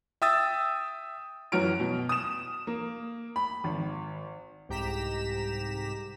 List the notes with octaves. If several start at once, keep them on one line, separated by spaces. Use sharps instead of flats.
E5 G5 D#6 E6 A6
F#2 E3 F#4 C#5 F6 D7
B2
D#6 E7
A#3
B5
G#1
C2 G#2 G4 A#5 B6 E7